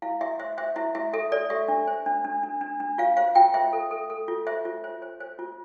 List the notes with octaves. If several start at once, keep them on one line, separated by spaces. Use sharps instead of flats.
E4 F5
E4 E5
C5 E5
C5 E5
E4 E5
E4 E5
A4 E5
A4 D5
G4 E5
D4
C5
D4
D4
D4
D4
D4
F4 F5
C5 F5
F4 G5
C5 E5
A4
A4
A4
F4
C5 E5
F4
C5
C5
C5
F4